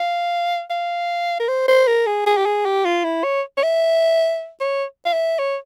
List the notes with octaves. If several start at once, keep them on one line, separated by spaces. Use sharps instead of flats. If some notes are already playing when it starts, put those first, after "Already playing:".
Already playing: F5
F5
A#4
C5
C5
A#4
G#4
G#4
G4
G#4
G4
F4
E4
C#5
C#5
E5
C#5
F5
E5
C#5